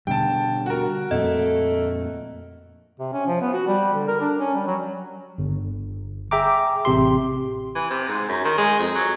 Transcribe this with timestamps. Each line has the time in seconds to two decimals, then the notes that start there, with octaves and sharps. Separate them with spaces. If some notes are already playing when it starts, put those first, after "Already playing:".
0.07 B2 D3 G3 G5 A5
0.66 F#4 A#4
1.11 F2 A#2 A3 C4 D#5
2.99 C3
3.13 C#4
3.27 F3
3.41 B3
3.53 F#4
3.67 G3
3.93 D3
4.08 A#4
4.21 D4
4.39 C#4
4.54 G3
4.67 F#3
5.38 G1
6.31 G#4 E5 G5 A#5 D6
6.85 A1 C3 G4 C6
7.75 E3
7.90 C3
8.09 G#2
8.29 F#2
8.45 D#3
8.58 G#3
8.79 F2
8.95 F#3